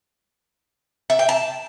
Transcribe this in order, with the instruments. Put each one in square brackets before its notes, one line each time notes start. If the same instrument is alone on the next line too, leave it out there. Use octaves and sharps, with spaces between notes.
[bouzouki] E5
G5
A5